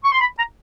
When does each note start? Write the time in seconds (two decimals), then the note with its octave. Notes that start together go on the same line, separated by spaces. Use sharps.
0.03 C#6
0.12 C6
0.20 B5
0.38 A#5